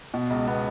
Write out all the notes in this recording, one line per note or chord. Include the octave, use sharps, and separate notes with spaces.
B2
C#2
B3